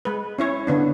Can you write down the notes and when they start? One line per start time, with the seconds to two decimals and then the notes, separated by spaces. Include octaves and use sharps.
0.05 G#3 B4
0.39 C#4 E4 C#5
0.67 D3 B3 D4